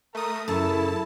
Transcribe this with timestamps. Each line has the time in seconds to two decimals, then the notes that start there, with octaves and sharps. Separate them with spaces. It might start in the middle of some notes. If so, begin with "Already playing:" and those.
0.15 A3 A#4 D#6
0.48 F#2 C#3 E4 A4 A5